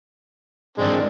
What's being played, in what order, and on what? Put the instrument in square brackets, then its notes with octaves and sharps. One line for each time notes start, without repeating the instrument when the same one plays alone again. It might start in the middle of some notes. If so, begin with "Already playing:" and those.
[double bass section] G#2 D#3 E3 [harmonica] G#3 C4 D4